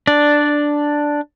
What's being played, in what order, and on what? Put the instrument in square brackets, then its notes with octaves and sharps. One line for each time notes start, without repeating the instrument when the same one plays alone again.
[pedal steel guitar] D4 D5